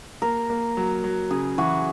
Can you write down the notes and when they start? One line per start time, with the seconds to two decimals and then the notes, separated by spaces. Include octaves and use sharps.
0.22 A#3 A#4
0.50 A#3
0.77 F#3
1.04 F#3
1.31 C#3 G#4
1.58 E3 F#4